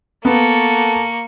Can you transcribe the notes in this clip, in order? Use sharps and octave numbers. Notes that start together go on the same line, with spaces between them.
A#3 B3 A4 C#6